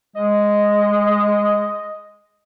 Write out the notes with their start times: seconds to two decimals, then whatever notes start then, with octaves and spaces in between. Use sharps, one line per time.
0.16 G#3 D#5